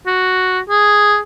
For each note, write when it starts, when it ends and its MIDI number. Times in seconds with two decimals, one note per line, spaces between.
0.06 0.59 66
0.69 1.18 68